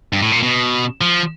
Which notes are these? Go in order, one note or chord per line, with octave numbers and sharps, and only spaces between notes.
G2
A2
A#2
B2
F3